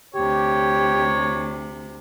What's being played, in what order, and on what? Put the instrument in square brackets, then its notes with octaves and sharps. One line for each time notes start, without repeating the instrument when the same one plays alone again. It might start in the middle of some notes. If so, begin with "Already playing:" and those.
[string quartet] D2 C3 [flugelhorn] G4 [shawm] C#5